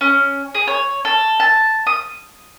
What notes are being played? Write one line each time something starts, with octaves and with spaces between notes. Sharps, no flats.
C#4
G#4
C#5
A4
A5
D#6